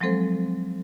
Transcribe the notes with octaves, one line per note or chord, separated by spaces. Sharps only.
F3 F#3 G#3 C4 A4 C5